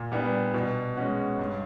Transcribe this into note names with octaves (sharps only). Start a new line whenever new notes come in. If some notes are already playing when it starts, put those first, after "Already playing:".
Already playing: A#2
G3 B3 D4
B2
G#3 C#4 F#4
G2